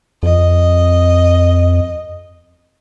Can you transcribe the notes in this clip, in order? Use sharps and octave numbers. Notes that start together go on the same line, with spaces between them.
F2 D#5